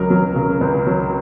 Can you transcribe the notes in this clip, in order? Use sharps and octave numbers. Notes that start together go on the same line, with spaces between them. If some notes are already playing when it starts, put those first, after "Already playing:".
Already playing: C#2 F#3 A#4
F#3
C#3
C#2
F#3